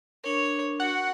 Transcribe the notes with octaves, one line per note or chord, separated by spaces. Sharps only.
D4 A#4 C#5
F#4 F#5